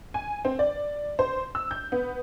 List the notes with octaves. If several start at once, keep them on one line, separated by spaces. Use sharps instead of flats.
G#5
C4
D5
C5
E6
G6
B3